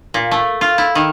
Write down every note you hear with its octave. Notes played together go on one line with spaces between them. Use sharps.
A#2
A3
F4
E4
D#3